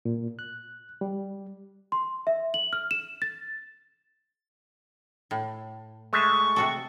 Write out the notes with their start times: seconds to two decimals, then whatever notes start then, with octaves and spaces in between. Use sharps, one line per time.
0.05 A#2
0.39 F#6
1.01 G3
1.92 C6
2.27 E5
2.54 F#7
2.73 F6
2.91 E7
3.22 A6
5.31 A2
6.13 G#3 A3 E5 C#6
6.56 C3 F#4 A4